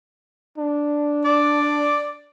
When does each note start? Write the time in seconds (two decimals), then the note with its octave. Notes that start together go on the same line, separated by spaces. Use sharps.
0.58 D4
1.25 D5